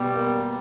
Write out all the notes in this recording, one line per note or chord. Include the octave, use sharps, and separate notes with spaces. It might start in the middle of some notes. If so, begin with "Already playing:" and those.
Already playing: B2 G3
A#3